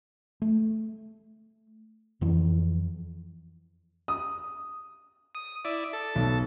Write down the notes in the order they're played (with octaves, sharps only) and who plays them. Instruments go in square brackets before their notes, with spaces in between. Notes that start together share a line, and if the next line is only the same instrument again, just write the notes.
[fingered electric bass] A3
F2 E3 F3
[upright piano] D#6
[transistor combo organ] D#6
E4 D5
A4
[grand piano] B1